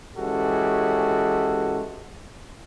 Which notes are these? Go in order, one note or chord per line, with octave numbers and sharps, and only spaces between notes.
E3 G#3 C#4 F#4 G4 A4